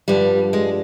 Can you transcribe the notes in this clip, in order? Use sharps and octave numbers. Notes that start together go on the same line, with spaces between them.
G2 D3 F3 G3
G#3